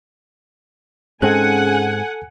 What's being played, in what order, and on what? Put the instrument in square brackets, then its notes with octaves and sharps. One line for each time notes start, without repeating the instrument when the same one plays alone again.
[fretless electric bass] G#2 G#3 C4 [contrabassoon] C#3 [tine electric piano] A4 F#6 [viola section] F#5 G#5